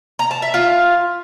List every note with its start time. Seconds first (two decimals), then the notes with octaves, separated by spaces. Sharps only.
0.19 A#5
0.31 A5
0.42 E5
0.54 F4